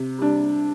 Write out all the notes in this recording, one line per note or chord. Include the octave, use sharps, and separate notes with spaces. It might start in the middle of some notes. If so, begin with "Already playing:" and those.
Already playing: C3
G3 D4